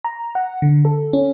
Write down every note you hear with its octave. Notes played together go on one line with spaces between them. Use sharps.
A#5
F#5
D3
A4
C#4